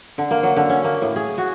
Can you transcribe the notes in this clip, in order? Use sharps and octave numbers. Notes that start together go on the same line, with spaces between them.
D3
A#3
F#3
D3
C#4
A#3
A2
G#4
F#4